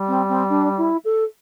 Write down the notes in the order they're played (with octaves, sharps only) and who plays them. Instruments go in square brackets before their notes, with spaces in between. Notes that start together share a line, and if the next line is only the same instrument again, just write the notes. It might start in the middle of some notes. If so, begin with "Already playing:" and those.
Already playing: [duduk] G3
[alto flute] C4
C4
D4
E4
A4